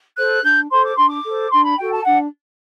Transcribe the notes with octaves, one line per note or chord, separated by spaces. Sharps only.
A4 C5 F#6
D4 G6
A4 C5 C6
D6
D4 C6
D6
A4 C5
D4 C6
B5
F#4 A4 G5
A5
D4 F#5